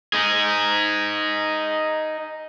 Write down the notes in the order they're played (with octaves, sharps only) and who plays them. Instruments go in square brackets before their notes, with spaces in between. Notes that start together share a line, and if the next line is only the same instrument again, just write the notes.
[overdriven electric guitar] D#4 G#4